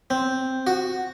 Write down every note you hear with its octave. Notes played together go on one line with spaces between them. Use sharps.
C4
F#4